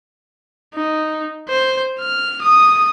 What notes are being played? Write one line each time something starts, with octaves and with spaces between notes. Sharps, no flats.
D#4
C5
F6
D#6